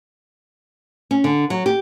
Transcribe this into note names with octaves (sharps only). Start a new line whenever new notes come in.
C#4
D3
F#3
G4